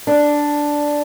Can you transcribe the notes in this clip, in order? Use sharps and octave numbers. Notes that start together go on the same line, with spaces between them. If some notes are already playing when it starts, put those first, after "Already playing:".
D4